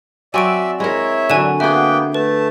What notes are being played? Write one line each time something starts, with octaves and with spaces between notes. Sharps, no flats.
F#3 C4 D5 E5 G#5 C#6 E6 D7
G#3 E4 A#4 C#5 E5
D3 F#3 G#5 C#6 E7
A#3 B3 F#4 G#4 E5 G5
A3 B4 A5